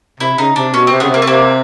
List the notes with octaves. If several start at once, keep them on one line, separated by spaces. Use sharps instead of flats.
C3 E4
C#3 D#4
C3 D4
B2 C#4
C3 C4
C#3 B3
C3 A#3
A3
C3 A#3